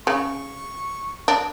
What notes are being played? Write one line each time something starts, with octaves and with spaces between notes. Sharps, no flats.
C#3 C#6
D4